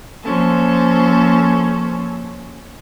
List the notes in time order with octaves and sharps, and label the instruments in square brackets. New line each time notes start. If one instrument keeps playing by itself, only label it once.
[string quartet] F3 A#3 C#4 A4 C5